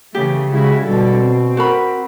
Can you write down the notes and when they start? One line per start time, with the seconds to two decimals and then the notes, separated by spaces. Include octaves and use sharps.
0.15 C#3 E3 A3 G4
0.50 C#3 G#3 E4 F#4
0.83 B2 D3 G3 A4
1.17 C4
1.57 F#4 A#4 B5